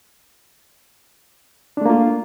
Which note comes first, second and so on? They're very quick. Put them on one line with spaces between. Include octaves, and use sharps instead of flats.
D4 A3 A#3 F4